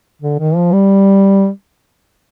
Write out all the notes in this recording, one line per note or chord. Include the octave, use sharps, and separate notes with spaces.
D3
D#3
F3
G3